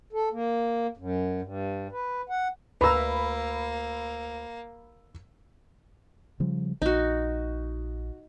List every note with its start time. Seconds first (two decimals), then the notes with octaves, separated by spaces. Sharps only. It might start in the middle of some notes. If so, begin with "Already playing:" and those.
0.13 A4
0.32 A#3
0.97 F#2
1.42 G2
1.91 B4
2.29 F#5
2.81 D2 A#3 B4 A#5 B5 E6
6.40 C#3 F3 G3
6.82 A#1 D#4 F#4